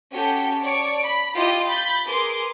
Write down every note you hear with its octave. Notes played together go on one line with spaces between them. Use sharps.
C#4 F#4 G4 A4 G5
C#5 D5 A5 C#6 D7
B5
E4 F4 G4 D#5
B5 G6 A6
G#4 A#4 B4 C6 D6